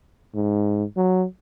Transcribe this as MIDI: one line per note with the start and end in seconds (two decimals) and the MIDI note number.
0.35 0.84 44
0.97 1.24 54